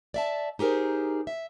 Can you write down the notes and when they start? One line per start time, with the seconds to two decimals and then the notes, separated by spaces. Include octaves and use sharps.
0.14 D5 E5 A5
0.59 D#4 G4 G#4 A#4 C5
1.27 E5